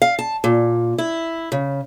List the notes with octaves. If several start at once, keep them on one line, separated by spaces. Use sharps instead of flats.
F5
A5
A#2
E4
C#3